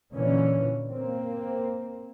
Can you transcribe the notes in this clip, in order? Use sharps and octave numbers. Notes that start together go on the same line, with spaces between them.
A#2 D3 E3 C#4
A#3 C4